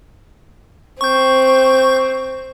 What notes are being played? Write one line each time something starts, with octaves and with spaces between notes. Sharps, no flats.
C4 C#6 G6